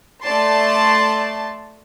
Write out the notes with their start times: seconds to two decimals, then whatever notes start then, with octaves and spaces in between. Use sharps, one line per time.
0.23 A3 D5 A5 C6